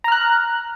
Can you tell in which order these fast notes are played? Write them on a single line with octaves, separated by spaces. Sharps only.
A#5 F6 F#6